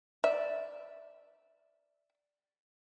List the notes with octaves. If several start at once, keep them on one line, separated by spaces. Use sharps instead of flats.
D5 E5